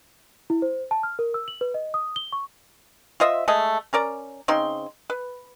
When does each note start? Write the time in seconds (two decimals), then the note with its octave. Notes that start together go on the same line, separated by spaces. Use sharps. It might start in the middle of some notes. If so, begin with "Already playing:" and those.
0.50 E4
0.62 C5
0.91 A5
1.03 F6
1.19 A#4
1.34 E6
1.48 F#7
1.61 B4
1.74 D#5
1.94 D#6
2.16 G7
2.32 C#6
3.20 F4 C5 D#5 E5
3.48 G#3 A3 D#5
3.93 C#4 A#4 D5 A#5
4.48 C#3 C4 D#4 C6
5.10 B4